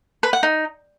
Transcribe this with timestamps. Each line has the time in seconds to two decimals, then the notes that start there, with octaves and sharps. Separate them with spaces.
0.23 B4
0.33 F#5
0.43 D#4